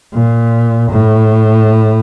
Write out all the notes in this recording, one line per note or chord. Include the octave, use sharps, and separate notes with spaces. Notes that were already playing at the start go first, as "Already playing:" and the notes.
A#2
A2